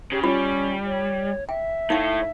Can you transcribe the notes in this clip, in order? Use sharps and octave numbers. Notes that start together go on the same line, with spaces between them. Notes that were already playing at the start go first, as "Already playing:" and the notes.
C#3 G4
G3 C#4 F4
C#5
E5 G5
A2 A3 D#4 F5